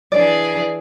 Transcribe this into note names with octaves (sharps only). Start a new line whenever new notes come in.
E3 D4 G#4 D5